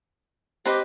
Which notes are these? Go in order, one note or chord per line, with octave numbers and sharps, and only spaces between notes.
C4 G4 B4 D#5